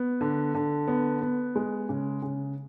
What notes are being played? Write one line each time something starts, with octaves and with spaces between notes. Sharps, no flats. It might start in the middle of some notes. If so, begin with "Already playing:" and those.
Already playing: B3
D3
D3
B3
B3
G#3
C#3
C#3